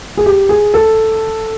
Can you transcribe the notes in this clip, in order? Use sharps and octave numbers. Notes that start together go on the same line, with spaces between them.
G#4
G4
G#4
A4